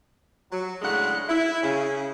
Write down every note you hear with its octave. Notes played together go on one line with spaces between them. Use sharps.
F#3
A2 C#3 G#3 D4 F#5
E4
C#3